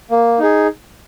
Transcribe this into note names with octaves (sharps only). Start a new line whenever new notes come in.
A#3
D#4 G#4